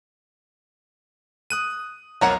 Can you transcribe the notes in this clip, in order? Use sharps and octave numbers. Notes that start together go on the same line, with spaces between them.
D#6 F#6 D#7
B1 F2 F#3 A#4 C#5 F#5